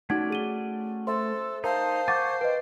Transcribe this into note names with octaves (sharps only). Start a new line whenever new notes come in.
A3 C#4 D#4 F#4 D5 F#5 G#6
G#4 D#7 G7
A4 C5 E5 C6
D#4 A#4 C5 F5 A5
F#5 G#5 C#6 D6 G6 A6
B4 D#5 G5